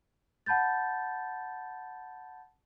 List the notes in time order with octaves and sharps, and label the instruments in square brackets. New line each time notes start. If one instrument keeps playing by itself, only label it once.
[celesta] F#5 A5 B5 G6 A6